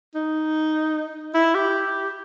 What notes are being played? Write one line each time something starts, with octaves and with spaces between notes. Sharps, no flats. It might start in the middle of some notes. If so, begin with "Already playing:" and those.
D#4
E4
G4